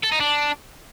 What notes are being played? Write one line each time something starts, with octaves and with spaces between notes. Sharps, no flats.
A4
D#4
D4